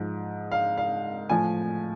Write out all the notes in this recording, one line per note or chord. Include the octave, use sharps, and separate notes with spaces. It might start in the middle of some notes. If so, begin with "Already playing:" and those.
Already playing: G#2 F3
F5
F5
A2 F3 G#5